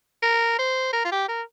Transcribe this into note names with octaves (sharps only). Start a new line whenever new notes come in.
A#4
C5
A#4
F4
G4
A#4